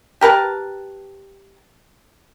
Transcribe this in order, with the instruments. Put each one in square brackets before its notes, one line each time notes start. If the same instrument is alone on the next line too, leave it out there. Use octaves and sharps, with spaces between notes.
[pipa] G4 A#4 B4 A5